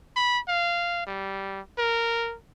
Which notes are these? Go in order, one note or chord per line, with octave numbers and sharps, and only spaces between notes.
B5
F5
G3
A#4